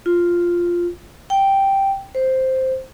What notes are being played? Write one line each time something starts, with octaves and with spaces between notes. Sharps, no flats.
F4
G5
C5